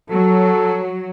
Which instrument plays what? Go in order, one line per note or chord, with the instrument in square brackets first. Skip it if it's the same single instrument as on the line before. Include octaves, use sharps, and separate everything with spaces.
[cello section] F#3 [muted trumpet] A4